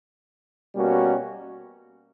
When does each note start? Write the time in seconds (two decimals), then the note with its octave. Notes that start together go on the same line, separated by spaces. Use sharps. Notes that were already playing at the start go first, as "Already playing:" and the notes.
0.75 B2 G3 A#3 C#4 F#4